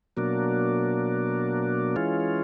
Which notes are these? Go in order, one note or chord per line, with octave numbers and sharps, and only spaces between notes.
B2 F#3 A#3 D4
E3 G#3 C#4 F4